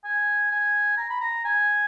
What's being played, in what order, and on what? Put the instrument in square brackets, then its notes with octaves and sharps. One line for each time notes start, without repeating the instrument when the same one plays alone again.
[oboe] G#5
G#5
A#5
B5
A#5
G#5